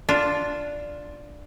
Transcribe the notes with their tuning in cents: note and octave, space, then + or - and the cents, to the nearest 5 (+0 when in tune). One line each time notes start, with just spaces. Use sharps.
D4 +0 F4 +0